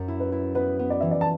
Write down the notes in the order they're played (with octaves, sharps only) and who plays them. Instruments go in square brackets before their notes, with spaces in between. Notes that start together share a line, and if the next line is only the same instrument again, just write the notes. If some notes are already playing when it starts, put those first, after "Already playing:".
Already playing: [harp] F#2
E4
[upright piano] B4
[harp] E4
[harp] B3 [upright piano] B4
[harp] B3
[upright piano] D5
[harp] E3 [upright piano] E5
[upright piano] D5
A5